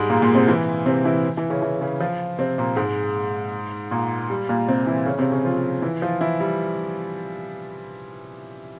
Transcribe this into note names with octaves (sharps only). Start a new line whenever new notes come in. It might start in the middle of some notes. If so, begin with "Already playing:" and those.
Already playing: G#2 G3 G#3
A#2 A#3
A#2 A#3
C3 C4
E3 E4
C3 C4
E3 E4
E3 E4
C#3 C#4
E3 E4
C#3 C#4
F3 F4
C3 C4
A#2 A#3
G#2 G#3
A#2 A#3
G3
A#2 A#3
C3 C4
E3 E4
C#3 C#4
C3 C4
C#3 C#4
F3 F4
E3 E4
F3 F4
E3 E4
G3